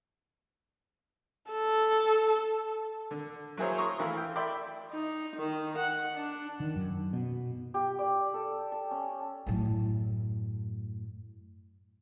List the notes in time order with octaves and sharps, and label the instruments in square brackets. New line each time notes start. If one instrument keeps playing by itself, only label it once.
[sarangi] A4
[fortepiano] D3
F#3 A#3 E4 G#4 C5 C#5
A#5 C6 C#6 D#6
E3 A3 F5 B5
G5
D5 E5 G5 B5 C6 D6
[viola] D#4
D#3
F#5
D4
[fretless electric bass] D#3
F#2
B2
[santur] G4
D5
A4
A5
C#4
[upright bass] F#2 A2